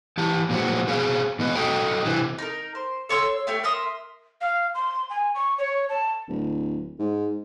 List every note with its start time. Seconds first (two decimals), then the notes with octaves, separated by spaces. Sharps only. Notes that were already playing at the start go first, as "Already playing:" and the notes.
0.18 E3 G4 A5
0.49 A#2 F3 F#3 G#3 C4 F#4
0.87 B2 C4 G#4 F5
1.39 E2 B3 D#5
1.55 F#4 A4 D#5 G5 A#5
2.05 C3 E3
2.39 D#4 A#4
2.75 C5
3.09 A4 C#5 C6 E6
3.47 A3 G4 C#5
3.63 A#4 E5 C6 D#6
4.41 F5
4.74 C6
5.10 G#5
5.34 C#6
5.58 C#5
5.89 A5
6.28 D1
6.99 G#2